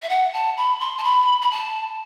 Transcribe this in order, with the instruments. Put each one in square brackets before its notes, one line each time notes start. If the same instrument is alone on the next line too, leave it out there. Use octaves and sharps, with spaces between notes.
[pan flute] E5
F#5
A5
B5
C6
A5
B5
B5
A5